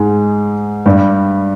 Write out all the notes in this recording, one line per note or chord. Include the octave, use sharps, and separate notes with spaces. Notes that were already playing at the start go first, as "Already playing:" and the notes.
Already playing: G#2 G#3
G2 G3